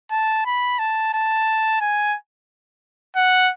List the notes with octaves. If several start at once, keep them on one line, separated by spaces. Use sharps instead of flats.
A5
B5
A5
A5
G#5
F#5